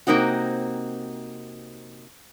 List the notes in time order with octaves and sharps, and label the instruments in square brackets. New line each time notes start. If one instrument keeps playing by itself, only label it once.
[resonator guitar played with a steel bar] C3 A#3 C4 D#4 F#4